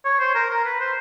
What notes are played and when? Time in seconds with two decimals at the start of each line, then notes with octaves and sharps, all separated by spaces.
0.05 C#5
0.20 C5
0.35 A#4
0.50 A#4
0.65 B4
0.80 C5